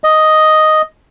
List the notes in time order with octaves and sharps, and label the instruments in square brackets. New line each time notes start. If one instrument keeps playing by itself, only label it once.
[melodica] D#5